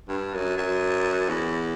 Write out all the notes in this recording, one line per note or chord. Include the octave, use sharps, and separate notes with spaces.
G2
F#2
F#2
E2